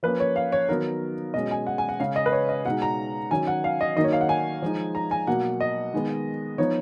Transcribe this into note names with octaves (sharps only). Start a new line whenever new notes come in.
F3 A#3 C#4 B4
C#5
F5
C#5
D#3 F#3 B3 D#4 A#4
B2 G#3 C#4 D#5
G#5
F#5
G#5
F#5
C#3 G#3 C#4 F5
D#5
B4
C#5
D#5
B2 G#3 D#4 F#5
A#5
D#3 F#3 C#4 G#5
F#5
F5
D#5
D#3 F#3 A#3 D#4 D#5
C#5
F5
F#5
G#5
F3 G#3 D#4
A#5
G#5
B2 F#3 A#3 F#5
D#5
D#3 G#3 B3
F3 B3 D#4 C#5